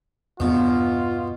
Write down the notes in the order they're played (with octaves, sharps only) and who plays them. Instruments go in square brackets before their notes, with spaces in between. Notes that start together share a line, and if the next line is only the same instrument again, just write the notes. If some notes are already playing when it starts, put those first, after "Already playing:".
[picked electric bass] E2 G2 B3 [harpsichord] B2 [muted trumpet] F4